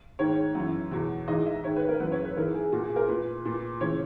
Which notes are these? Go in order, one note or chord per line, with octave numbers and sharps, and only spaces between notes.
G#2 D#3 C#5
F#2 E3
E2 B2
G#2 E3 D#5
E5
G#2 D#3 C#5
B4
A#4
F#2 E3 B4
C#5
B4
G#2 E3 A#4
G#4
A#2 F#4
G#4
A#4
A#2 B4
A#2
C#3 E3 C#5